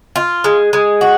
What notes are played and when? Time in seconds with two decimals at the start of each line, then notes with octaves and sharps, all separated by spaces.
0.16 F4
0.44 G#3
0.73 G#3
1.01 F#4